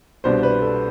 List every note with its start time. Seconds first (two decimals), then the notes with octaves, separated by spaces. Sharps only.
0.24 C2 B2 B3 D4 C5
0.43 B4
0.62 A4